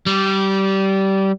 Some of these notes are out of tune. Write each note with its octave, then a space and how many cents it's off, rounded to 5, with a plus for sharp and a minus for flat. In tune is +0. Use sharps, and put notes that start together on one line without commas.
G3 -20